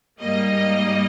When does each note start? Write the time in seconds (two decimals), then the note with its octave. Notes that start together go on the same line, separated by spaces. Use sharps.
0.22 G#2 G3 A#3 D#5